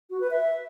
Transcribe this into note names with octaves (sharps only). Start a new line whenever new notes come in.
F#4
B4
E5